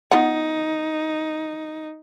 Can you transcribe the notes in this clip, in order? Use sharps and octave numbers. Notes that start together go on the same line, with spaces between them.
B3 D#4 F4 F#5